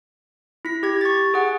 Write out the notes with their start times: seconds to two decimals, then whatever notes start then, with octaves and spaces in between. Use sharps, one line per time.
0.65 E4 B6
0.83 G4 G#6
1.01 C#6 A6
1.34 G#4 F#5